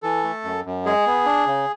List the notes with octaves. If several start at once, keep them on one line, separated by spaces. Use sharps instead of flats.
E3 A4
A3
F#2
F#2
G#3 G#4
B3
D4
C#3